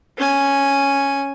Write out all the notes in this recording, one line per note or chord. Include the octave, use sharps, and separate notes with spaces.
C#4 G#5